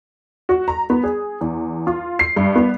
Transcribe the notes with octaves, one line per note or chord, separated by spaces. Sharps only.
F#4
A#5
B3
G#4
E2
F4
C7
G2
B3